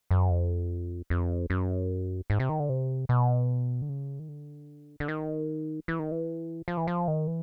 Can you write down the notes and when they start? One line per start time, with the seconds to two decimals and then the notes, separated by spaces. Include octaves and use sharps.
0.11 F#2
0.30 F2
1.10 F2
1.50 F#2
2.30 G#2
2.40 C3
2.49 D#3
2.60 D3
2.69 C3
3.09 B2
3.82 D3
3.89 C#3
4.19 D#3
4.29 D3
5.00 D3
5.08 D#3
5.88 E3
5.99 D#3
6.12 E3
6.68 F3
6.77 E3
6.87 F3
7.08 D#3
7.27 E3